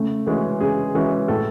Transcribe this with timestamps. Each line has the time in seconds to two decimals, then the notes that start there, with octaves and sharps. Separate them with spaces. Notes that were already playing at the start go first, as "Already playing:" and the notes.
Already playing: C#3 A3
0.26 E3 G#3 C#4 F#4
0.60 C#3 G#4
0.95 E3 G#3 C#4 F#4
1.28 A2 A4